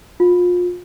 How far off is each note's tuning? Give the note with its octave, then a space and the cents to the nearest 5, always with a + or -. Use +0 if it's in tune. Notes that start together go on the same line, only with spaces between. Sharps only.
F4 +30